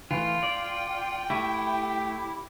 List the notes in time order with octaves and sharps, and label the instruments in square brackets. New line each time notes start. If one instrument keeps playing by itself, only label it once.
[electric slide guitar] E3 A3 [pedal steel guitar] F4 [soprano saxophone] G5
[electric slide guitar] D5
[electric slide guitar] A3 [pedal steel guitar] E4 [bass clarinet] G4